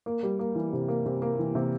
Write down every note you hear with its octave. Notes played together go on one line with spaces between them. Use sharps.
A#3
G3
A#3
E3
C3
A#3
C3
A#3
E3
C3